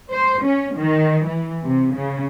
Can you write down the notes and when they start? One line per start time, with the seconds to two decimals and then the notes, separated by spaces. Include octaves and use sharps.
0.12 C5
0.44 C#4
0.77 D#3
1.27 E3
1.64 C3
1.95 C#3